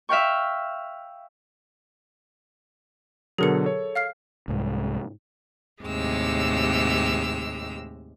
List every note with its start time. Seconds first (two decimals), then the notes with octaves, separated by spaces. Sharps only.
0.09 E5 F5 G5 C#6
3.38 B2 D3 F#3 G#4 A#4 C#7
3.65 A4 C#5
3.95 F5 F6 C7
4.48 C2 G#2
5.83 D#2 A2 C3 G#3 G4 E6